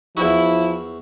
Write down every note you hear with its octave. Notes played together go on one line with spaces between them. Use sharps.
E2 F3 E4 F#4